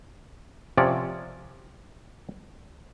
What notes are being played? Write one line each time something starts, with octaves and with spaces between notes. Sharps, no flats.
C3 F3 C#4 D5